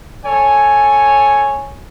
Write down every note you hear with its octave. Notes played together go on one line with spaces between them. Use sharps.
A4 C#5 G#5